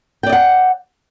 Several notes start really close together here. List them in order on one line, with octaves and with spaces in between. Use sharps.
G5 D5 D#5 F#5